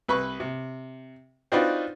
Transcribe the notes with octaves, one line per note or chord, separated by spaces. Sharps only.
C2 B4 B5 C#6
C3
C4 D4 D#4 F4 F#4 B4